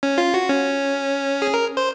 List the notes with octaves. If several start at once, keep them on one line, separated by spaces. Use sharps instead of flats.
C#4
F4
F#4
C#4
G#4
A#4
C5